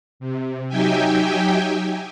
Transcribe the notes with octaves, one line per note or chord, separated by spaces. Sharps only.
C3
F#3 D#4 G4 E5 G5 G#5